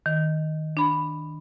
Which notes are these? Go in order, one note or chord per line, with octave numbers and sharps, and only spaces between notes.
D#3
D4 B5